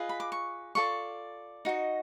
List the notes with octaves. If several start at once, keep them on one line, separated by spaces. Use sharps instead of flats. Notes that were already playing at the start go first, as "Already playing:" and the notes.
Already playing: F4 G#4 B4 D#5
B5
D6
C#6
F4 A4 D5 C#6
D#4 F#4 D#5